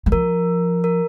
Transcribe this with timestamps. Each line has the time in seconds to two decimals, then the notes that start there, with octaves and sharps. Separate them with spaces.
0.06 G3
0.12 F3 A#4
0.84 A#4